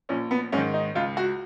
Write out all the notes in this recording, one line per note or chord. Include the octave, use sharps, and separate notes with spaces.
A#1 C#4
B3
G#2 D#3 C#4
D#4
C#2 F4
F#4